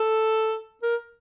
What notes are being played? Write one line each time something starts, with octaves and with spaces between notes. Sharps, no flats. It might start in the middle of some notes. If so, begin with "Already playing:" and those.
Already playing: A4
A#4